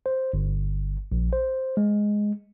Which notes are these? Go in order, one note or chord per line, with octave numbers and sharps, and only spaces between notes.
C5
G1
A#1
C5
G#3